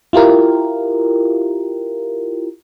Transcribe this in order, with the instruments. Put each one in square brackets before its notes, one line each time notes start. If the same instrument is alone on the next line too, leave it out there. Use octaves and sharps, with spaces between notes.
[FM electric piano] E4 F4 G4 A#4